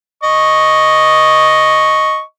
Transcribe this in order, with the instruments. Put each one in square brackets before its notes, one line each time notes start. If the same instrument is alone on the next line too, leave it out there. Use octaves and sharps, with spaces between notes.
[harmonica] D#5 C#6